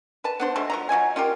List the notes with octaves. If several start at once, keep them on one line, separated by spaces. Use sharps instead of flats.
B4 A5
B3 D4 C5
B2 G#3 A3 C6
F3 F#3 A#5
F3 F#3 D#5 G#5
C#4 F4 G4 A#4